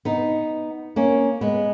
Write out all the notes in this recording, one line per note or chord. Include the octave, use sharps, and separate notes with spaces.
B3 D#4
A#3 C#4
G#3 B3